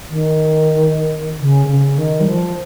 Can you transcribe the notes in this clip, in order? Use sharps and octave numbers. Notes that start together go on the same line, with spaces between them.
D#3
C#3
D#3
C#3
D#3
G3
F3